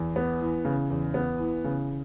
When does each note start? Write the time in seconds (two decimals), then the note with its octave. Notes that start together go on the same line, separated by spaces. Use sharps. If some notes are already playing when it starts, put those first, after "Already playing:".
Already playing: E2
0.16 B3
0.41 E3
0.65 C#3
0.90 E2
1.14 B3
1.39 E3
1.64 C#3